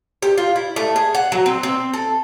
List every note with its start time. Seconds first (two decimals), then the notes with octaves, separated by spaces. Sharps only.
0.22 G4
0.38 F4
0.56 E4
0.76 A3
0.96 G#4
1.15 F#5
1.32 F#3
1.46 C4
1.63 C4
1.93 A4